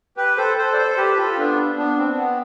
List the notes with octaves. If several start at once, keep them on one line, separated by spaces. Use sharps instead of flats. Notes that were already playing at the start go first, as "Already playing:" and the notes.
G4 B4
A4 C5
A4 C5
D5
A4 C5
G4 B4
F4 A4
B3 D4
B3 D4
C4
B3